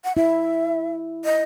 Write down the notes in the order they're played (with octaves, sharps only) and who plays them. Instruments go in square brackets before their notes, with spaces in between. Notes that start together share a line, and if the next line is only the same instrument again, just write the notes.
[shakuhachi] F#5
[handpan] E4 [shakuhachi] E5
[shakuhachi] D#5